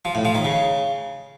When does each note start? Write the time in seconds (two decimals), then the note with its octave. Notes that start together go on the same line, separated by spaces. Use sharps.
0.05 F3
0.15 A2
0.25 F3
0.35 D#3
0.45 C#3